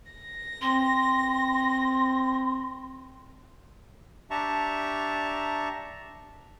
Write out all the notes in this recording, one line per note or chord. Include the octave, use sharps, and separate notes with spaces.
A#6
C4 C6
D4 G4 E5 A5 A#5 C#6